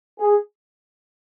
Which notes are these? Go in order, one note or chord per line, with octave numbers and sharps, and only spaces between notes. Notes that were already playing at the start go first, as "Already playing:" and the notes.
G#4